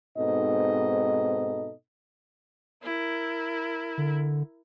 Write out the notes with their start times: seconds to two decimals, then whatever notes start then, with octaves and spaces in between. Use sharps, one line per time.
0.17 G#2 B2 C4 D#4 A4 D#5
2.83 E4 A#4
3.98 D3